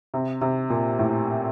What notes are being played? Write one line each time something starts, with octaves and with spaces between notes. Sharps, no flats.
C3
C3
A#2
A2